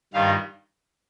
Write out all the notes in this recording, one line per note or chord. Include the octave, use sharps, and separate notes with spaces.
G2 D#3 G3 F4 F5